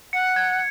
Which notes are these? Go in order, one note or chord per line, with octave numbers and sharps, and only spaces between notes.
F#5 C#7
G#6